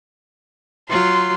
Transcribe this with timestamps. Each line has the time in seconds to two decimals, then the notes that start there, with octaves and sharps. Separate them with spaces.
0.89 F#3 F4 C6